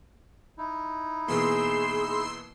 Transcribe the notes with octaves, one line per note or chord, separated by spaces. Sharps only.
D#4 E4
B2 E3 A#3 G#4 C6 E6 C7